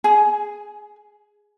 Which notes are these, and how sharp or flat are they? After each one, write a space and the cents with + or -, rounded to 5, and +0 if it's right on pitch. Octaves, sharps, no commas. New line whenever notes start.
G#4 +0 G#5 +25